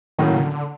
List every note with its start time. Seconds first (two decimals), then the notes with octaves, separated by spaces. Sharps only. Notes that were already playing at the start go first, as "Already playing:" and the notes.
0.18 A2 D#3 F#3 A#3 C#4
0.34 C#3
0.42 D3